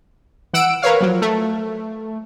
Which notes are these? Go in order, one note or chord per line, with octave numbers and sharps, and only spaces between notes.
E3 F#5 E6 D7
A#4 B4 C#5 F5
F3 F#3
A3